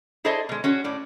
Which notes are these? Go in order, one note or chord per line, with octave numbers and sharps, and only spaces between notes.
E4 G#4 A4 C5 D5 D#5
B2 G#3
C#4 F#4 G#4
A2 D5